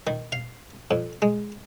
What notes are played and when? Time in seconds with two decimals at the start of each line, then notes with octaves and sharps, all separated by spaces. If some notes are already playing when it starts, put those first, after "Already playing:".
0.07 D#3
0.32 F5
0.91 F2
1.22 G#3